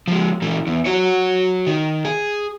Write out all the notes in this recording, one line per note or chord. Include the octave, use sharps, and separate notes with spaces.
F3 G#3
A#2 E3
E2
F#4 C#5
D#3
G#4